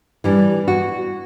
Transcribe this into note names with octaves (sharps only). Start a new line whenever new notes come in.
E3 G3 D4
F#4